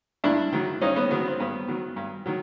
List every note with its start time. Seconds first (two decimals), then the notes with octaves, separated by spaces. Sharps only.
0.24 G2 D4 E4
0.53 D#3 F#3
0.81 G2 C#4 D#4
0.96 B3 C#4
1.11 D#3 F#3 B3
1.26 C4
1.40 G2 B3
1.68 D#3 F#3
1.96 G2
2.26 D#3 F#3